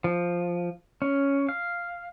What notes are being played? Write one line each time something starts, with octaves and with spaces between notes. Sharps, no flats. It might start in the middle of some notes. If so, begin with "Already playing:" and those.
F3
C#4
F5